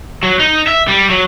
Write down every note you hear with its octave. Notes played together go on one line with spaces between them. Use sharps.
F#3
D#4
E5
G3
F#3